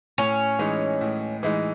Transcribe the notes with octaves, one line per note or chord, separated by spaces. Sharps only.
A2 C#4
E3 G#3 D#4
A2
E3 G#3 D#4